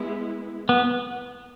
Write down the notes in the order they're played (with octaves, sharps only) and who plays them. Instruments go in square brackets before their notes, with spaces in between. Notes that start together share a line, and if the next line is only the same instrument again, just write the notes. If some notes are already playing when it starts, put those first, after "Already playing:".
Already playing: [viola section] G#3 B3 E4
[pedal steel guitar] B3